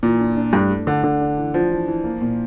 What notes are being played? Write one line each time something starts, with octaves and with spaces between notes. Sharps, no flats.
A#2 E3
D4
D4
G2 A3
A3
D3 D4
D3 D4
D4
E3
F3 D4
E3
E3
A#3
A#2